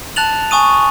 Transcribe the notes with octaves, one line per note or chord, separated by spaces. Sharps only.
A5 F#6 A6 F7 F#7
G#5 C#6 D#6 D#7